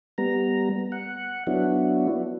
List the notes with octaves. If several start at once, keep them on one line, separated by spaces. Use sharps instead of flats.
G3 B3 A#5
F#5
F#3 B3 D4 E4 F#4